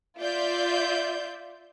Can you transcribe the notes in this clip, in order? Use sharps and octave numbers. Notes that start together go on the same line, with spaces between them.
F4 D5 E5 G6